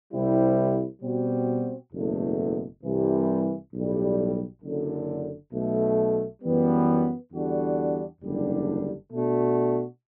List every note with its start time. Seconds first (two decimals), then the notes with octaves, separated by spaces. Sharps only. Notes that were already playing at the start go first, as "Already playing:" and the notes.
0.12 C2 C3 G3 C4 E4
1.02 B2 G3 C4 F#4
1.93 F#1 E2 B2 A3
2.82 C2 C3 E3 G3
3.73 B1 A2 G3
4.62 F#1 F#2 D3
5.52 B1 B2 A3
6.42 F#2 E3 G3 B3
7.31 E2 D3 G3 D4 F#4
8.21 F#1 E2 D3 G3 D4
9.12 B2 A3 D4 F#4